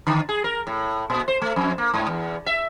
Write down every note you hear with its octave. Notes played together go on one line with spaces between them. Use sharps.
D3
G#4
A#4
A2
A#2
C5
A3
F2
A#3
G#2
E2
E5